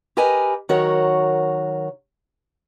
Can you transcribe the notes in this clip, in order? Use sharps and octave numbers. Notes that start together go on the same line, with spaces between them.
G4 A#4 B4 D#5 G#5
D#3 F#3 F#4 A#4 C#5